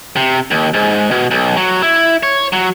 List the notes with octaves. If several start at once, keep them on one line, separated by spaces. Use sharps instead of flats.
C3
D#2
G#2
B2
B1
F#3
E4
C#5
F#3